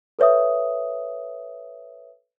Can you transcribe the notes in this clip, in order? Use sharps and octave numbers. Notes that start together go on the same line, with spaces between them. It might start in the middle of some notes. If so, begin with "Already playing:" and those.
A4 B4 C#5 E5 D#6